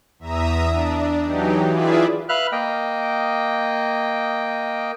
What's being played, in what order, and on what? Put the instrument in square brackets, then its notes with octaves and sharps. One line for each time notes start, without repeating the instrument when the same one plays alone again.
[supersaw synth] E2 E5 A#5 D#6
D4
E3 F#3 D#4 G4
E4 F4 G#4 B4 D5 E5
[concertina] B4 E5 F5 F6 F#6
A#3 D#5 G5